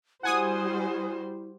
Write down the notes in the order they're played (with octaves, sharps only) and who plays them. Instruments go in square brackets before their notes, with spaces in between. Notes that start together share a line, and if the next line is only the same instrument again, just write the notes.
[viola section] G3 F#4 C5 [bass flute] E4 [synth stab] F#5 G#5 D#6